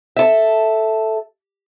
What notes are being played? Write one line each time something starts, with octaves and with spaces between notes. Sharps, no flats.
A4 E5